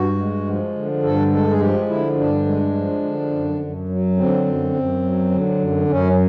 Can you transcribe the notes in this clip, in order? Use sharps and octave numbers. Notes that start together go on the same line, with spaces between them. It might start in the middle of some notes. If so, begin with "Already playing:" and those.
Already playing: G2 F#4
G#3
F3
D3
G2 A4
G#3 A4
G#4
F3 G4
D3 E4
G2 D4
G#3
F3
D3
F#2
F#2
F#3
D3 C4
F#2
F#2
F#3
D3
F#2
F#2 C#4